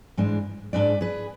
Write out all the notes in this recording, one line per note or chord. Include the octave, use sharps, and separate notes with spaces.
G#2 E3 G#3 D4
G#2 G#3 D4 B4 D5
G#4 B4